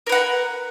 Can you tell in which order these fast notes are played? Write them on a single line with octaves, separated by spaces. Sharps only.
A#4 B4 F#5